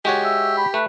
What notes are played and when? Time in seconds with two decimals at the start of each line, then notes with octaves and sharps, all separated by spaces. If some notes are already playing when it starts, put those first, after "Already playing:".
0.05 G#3 F#4 G4 C#5
0.24 E5
0.57 B5
0.74 A3 B4